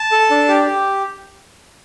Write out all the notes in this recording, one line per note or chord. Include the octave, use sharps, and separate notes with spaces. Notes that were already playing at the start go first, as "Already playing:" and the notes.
Already playing: A5
A4
D4
G4
G4